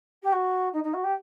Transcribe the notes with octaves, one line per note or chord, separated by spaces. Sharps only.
G4
F#4
D#4
D#4
F#4
G4